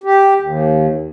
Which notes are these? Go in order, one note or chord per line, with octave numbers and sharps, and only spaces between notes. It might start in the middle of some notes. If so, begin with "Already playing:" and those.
G4
D#2